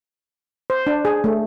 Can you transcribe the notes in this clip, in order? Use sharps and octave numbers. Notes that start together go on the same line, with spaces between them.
C5
D4
G#4
A3